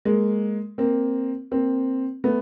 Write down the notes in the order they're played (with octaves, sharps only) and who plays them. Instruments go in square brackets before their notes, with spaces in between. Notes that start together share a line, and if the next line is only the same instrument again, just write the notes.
[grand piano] G#3 A#3
A#3 C4
A#3 C4
A3 B3